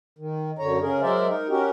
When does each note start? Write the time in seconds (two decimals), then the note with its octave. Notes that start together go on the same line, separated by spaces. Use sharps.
0.19 D#3
0.59 F#2 D3 C#5 A#5
0.81 C#3 C#4 G#4 A#4
1.02 F#3 G#3 A#4 C5 D5 E5
1.28 D#4 A#4
1.49 C#4 F#4 G4 A#4